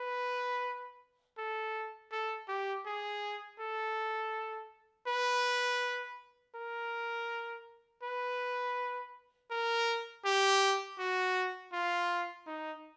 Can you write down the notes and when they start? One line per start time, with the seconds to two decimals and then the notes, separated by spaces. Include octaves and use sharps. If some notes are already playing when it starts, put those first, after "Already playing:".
Already playing: B4
1.38 A4
2.12 A4
2.48 G4
2.86 G#4
3.60 A4
5.07 B4
6.55 A#4
8.03 B4
9.51 A#4
10.25 G4
10.99 F#4
11.73 F4
12.47 D#4